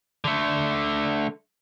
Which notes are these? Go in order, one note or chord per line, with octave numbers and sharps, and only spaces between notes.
D3 A3